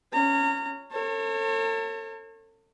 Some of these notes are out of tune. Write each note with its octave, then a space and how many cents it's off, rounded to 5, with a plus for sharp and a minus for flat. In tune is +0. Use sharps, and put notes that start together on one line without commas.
C#4 +5 A#5 -30
A4 +40 C#5 -30